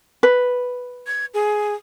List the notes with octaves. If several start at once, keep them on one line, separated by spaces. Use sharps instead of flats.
B4
G#6
G#4